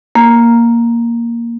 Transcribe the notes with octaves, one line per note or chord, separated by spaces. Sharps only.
A#3